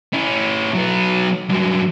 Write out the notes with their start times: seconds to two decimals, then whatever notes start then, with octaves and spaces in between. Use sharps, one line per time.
0.14 C#4 E4
0.75 F#3 B3
1.49 G2 F#3